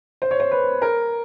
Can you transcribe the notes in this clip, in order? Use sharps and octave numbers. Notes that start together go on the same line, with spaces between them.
C5
C#5
C5
B4
A#4